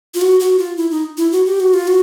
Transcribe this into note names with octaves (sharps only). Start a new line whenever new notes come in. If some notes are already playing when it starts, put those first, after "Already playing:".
F4
F#4
F#4
F4
E4
D#4
E4
F#4
G4
F#4
F4
F#4